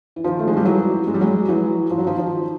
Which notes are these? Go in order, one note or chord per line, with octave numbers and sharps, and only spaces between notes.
E3
D#3 F3
A3
G#3
G3
E3 F#3
G#3
G3
F#3 G#3
E3 F#3
F3
F#3
D#3 F3
D#3 F3